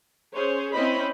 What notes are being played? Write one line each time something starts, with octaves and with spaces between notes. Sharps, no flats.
C#4 G#4 C5 C#5
C4 C#4 E4 C5 D#5 B5